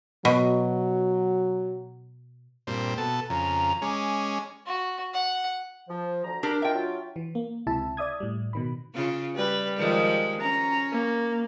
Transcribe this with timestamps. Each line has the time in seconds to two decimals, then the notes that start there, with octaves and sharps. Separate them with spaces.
0.25 B2 F#3
2.67 G2 A#2 C4
2.97 B2 A4
3.30 F2 C#3 A#5
3.82 G#3 C#4 D6
4.66 F#4
5.14 F#5
5.89 F3
6.24 D2 A#5
6.43 D4 G4 A#4
6.62 D#4 F4 A#4 E5 G5
6.74 F#3 F4
7.16 E3
7.35 A#3
7.67 C#2 C3 E4 E5 A5
7.97 D5 E5 D#6 G#6
8.20 A2 G3
8.53 B2 D#3 B5
8.94 C#3 F4
9.36 G3 B4
9.78 D#3 F3 G#3
10.41 C#4 A#5
10.92 A#3